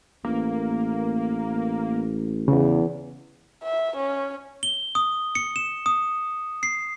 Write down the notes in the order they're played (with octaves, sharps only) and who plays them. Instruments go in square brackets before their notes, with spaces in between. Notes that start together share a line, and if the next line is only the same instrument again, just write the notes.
[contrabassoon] A1 [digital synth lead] A#3
[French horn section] E2 [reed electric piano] C#3
[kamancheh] E5
C#4
[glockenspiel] G7
D#6
C#7
E7
D#6
C7